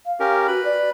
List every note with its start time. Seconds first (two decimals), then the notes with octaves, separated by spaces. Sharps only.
0.06 F5
0.20 C#4 G4 A#4
0.48 F#4 B4 B5
0.65 D5